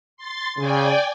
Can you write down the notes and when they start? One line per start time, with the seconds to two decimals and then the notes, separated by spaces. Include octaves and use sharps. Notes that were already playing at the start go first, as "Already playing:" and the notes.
0.17 C6 A6
0.58 C#3 D5 G5 G#5